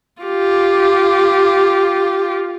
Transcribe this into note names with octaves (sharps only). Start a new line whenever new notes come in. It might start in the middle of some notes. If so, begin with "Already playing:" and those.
F4 G4